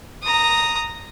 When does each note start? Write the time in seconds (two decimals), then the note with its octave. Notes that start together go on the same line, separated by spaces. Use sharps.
0.23 A#5 D#6